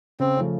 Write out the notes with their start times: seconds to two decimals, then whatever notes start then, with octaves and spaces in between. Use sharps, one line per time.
0.20 C#3 C4
0.37 F3 A3 C#4